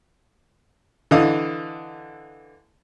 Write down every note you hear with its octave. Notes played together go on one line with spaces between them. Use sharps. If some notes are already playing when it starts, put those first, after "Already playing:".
D3 E3 D#5 F5 D#6